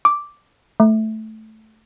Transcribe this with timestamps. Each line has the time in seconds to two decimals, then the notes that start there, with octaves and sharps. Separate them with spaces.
0.05 D6
0.80 A3